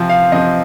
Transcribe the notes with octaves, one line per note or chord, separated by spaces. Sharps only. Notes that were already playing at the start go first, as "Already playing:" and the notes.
Already playing: C3 F3 C4
F5
C3 F3 C4 D#5